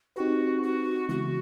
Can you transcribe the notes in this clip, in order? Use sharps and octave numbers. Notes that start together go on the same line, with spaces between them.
C4 D#4 F#4 G4 B4
F#4
C#3 E3 G#3 B3 E4 F#4